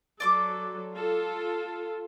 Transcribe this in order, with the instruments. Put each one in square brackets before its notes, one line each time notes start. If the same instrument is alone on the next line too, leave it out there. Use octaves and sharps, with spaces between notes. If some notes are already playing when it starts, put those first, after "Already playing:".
[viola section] F#3 A4 [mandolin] D5 C6 D6
[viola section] F4 A4